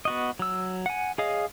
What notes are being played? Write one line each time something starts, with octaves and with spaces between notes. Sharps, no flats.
B3 F#4 D#5
F#3 E6
F#5 G#5
G#4 C#5 D#5 F5